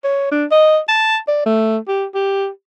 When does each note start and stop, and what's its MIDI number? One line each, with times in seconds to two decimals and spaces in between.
0.04 0.30 73
0.32 0.45 62
0.51 0.79 75
0.88 1.17 81
1.28 1.43 74
1.46 1.78 57
1.88 2.05 67
2.15 2.48 67